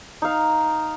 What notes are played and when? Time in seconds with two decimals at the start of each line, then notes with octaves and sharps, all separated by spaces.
0.22 D#4 F5